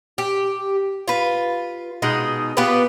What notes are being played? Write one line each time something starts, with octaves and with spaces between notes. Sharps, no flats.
G4
F4 B4
B2 G#3 D#4
B3 F4 G4 B4